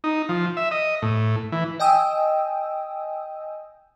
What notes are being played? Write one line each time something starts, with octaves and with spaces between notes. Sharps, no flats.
D#4
F3
E5
D#5
A2
E3
D#5 G5 G#5 D#6 E6